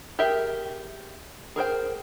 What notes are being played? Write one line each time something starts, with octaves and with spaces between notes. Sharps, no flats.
G4 G#4 A#4 E5 G5
G#4 A#4 C5 G5